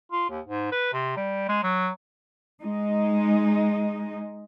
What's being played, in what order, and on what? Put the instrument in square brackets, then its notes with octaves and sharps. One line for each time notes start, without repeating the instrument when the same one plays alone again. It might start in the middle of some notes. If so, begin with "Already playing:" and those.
[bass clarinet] F4
D#2
G#2
B4
C3
G3
G#3
F#3
[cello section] G#3 D#4